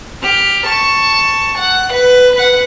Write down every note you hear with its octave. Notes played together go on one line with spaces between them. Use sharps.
G4 F6
A5 C#6
F#5
B4
B4 F#5